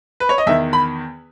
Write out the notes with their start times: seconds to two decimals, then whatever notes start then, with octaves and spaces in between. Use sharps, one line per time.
0.20 B4
0.29 C#5
0.38 D#5
0.46 E2 D#3 E5
0.73 B5